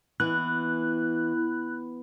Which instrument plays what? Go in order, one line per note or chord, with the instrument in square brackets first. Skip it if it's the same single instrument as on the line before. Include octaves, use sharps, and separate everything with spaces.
[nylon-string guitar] E3 [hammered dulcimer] B3 [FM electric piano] F#6